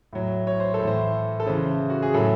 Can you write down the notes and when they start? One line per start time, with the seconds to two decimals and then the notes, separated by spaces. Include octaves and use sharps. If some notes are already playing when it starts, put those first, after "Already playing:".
0.13 A2 F#3
0.47 C#5
0.60 C5
0.74 A4
0.80 A2
0.85 E3 C5
1.40 A4
1.46 C#3 E3 C5
1.90 F#4
2.02 G#4
2.14 A2 F#3 A4